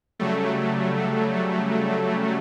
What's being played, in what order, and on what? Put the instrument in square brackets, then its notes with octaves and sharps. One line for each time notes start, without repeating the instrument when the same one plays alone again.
[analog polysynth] C#3 F#3 G3 A3